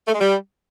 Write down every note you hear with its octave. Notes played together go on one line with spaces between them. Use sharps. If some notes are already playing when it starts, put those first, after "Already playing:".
A3
G#3
G3